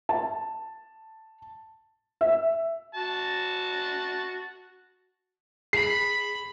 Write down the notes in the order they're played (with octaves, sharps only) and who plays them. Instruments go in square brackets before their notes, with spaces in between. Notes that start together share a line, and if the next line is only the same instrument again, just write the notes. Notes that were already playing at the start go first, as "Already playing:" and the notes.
[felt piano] A5
E5
[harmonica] F#4 A5
[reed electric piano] G#4 [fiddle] B5 [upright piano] C7